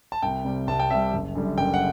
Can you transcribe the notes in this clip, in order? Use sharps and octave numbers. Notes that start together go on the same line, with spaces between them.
A5
C2 G5
C3 G3
C2 A5
G5
C3 G3 E5
F#1
F#2 D3 G3
F#1 G5
F#5